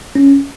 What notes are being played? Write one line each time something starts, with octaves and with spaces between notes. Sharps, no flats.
C#4